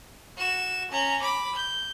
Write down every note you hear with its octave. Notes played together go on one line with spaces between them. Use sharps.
F#4 E7
C#4 A#5
B5 D6
G6